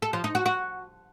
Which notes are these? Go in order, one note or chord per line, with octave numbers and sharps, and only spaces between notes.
A4
F3
D#4
F#4
F#4